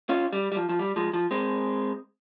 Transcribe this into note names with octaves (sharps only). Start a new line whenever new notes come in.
C#4 F4
G3
G3
F3
F3
G3
F3 G#3
F3
G#3 C4